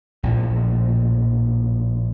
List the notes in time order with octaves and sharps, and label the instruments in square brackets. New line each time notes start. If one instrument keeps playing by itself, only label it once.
[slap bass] A#1 A2 F3